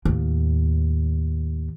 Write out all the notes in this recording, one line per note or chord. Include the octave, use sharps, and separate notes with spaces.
D#2 A2